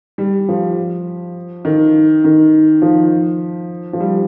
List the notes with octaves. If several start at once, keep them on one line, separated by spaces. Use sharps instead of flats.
G3
F3
D#3
D#3
F3
F3
G3